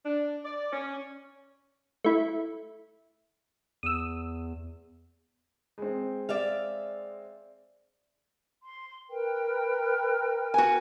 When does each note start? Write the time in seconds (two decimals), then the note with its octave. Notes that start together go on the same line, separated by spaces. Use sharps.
0.04 D4
0.44 D5
0.71 C#4
2.04 A3 E4
3.83 E2 D#6 E6
5.78 G#3 C4
6.29 D5 E5 F5
8.63 C6
9.09 A#4 B4 G5
10.54 F#4 G#5